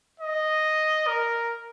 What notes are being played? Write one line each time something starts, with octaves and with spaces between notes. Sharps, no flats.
D#5
A#4